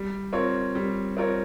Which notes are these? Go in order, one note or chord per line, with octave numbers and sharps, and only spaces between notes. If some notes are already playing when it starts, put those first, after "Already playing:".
Already playing: G3
C4 F4 A#4 C#5
G3
C4 F4 A#4 C#5